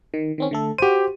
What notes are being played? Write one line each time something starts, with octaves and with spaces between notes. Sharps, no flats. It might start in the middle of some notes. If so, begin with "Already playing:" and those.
D#3
D#3 C4 C#4
D3 A3 A4
F#4 G4 C5 D#7